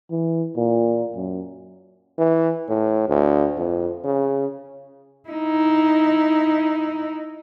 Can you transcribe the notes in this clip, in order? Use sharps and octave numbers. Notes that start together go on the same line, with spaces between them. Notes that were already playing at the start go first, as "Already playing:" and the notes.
E3
A#2
F#2
E3
A2
D2
F2
C#3
D#4 E4